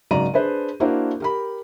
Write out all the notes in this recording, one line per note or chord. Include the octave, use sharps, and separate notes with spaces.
G#1 C#3 F#3 D5 A#5 D#7
D4 G#4 B4 C5
A#3 D4 E4 F#4 A#4 C5
G4 A#4 B5